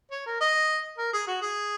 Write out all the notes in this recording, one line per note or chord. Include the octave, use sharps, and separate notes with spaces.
C#5
A#4
D#5
A#4
G#4
F#4
G#4